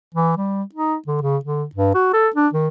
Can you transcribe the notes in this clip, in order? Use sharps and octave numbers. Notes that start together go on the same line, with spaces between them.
E3
G3
D#4
D3
C#3
D3
G2
F#4
A4
D4
D#3